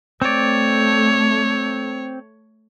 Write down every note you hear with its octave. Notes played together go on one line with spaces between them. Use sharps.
A3 C4 C#5 D5